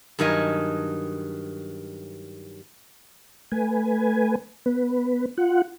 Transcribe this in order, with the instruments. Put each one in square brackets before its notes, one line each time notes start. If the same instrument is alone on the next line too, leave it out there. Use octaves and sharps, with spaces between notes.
[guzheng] G2 D#3 F#3 D#5 G#5
[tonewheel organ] A3 B4 G#5
B3 B4
F4 F#5